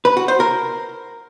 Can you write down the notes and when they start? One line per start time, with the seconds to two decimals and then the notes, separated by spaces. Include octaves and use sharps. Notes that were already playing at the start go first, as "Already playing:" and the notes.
0.05 B4
0.17 F#4
0.28 C5
0.40 A#4